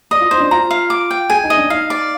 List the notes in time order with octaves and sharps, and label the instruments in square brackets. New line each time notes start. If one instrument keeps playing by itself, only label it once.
[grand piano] D5 [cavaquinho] D#5
[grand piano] F4
[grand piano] D#4 [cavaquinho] C5
[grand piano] D4
[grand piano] F4 [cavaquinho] A#5
[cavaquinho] F5
D6
G5
[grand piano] G#4 [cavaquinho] G#5
[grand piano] D#4
[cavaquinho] D#5
[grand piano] D4
[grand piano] D#4 [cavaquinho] F5
[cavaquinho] D5